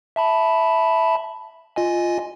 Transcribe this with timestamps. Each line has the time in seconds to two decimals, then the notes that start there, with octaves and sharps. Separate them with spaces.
0.16 E5 A5 B5
1.76 F4 D#5 G#5